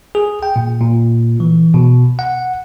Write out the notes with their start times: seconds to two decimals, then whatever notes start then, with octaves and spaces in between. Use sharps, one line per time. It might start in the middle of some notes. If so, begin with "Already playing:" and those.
0.15 G#4
0.43 G5
0.56 A#2
0.81 A#2
1.40 E3
1.74 B2
2.19 F#5